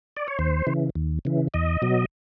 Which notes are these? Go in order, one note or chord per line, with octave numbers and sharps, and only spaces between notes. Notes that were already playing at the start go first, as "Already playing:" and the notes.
D5
C#5
D#2 C5
C#3 E3
D#2
C#3 E3
E2 D#5
B2 F#3